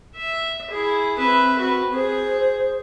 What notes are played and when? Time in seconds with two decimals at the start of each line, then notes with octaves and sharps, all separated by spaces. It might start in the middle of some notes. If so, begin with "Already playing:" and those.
0.16 E5
0.71 E4 G#4
1.19 C4 B4 E5
1.59 F#4 B4
1.94 G#4 C5